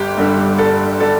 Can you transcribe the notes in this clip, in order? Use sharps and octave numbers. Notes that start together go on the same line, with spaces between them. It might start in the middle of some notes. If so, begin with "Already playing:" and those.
Already playing: G1 G4
G2 D3 G3
G1 A4
D3 G3 A4